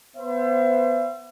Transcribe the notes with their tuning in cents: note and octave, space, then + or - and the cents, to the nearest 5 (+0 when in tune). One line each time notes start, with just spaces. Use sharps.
B3 +5 C5 +0 E5 +40